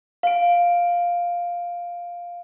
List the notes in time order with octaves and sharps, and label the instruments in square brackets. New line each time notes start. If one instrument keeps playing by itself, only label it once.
[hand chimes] F5 D7